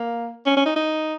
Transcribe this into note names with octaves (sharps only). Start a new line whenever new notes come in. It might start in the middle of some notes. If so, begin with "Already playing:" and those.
Already playing: A#3
C#4
C#4
D#4
D#4